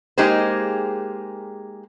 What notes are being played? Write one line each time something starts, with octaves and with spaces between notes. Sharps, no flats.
G#3 A#3 D#4 G4 G#4 C5